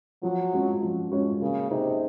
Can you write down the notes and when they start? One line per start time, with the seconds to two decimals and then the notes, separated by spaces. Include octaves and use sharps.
0.23 F3 F#3
0.53 G#3 C#4 F#4 C#5
0.83 F3
1.12 G#3 C#4 F#4 C#5
1.41 C#3 A#3
1.71 C3 D#4 G#4 C5